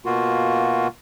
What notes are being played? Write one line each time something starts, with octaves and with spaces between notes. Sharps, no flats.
B2 A#3 F4 F#4